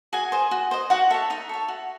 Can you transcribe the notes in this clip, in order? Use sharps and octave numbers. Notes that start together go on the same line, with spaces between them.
F#4 G#4 G#5
C5 D#5
F#4
C5 D#5
D#4 F#4 F#5
A4 C#5 E5
D#4 E5
A4 C#5
F#4